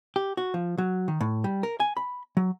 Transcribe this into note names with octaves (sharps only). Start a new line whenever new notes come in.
G4
F#4
F3
F#3
D#3
A2
G3
A#4
G#5
B5
F#3